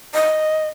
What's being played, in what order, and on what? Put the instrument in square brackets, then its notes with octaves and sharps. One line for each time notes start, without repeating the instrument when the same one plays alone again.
[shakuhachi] D#5